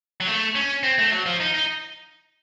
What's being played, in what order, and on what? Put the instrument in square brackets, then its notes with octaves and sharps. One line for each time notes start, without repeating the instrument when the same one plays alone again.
[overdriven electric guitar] F#3
A3
C#4
C4
A3
F#3
F3
D#4
D#4